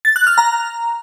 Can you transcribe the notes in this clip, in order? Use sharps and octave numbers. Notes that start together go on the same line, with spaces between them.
A6
F#6
F6
A#5